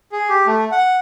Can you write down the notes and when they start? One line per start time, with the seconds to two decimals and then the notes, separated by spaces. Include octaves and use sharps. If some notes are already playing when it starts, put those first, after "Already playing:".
0.12 G#4
0.29 G4
0.47 A3
0.72 F#5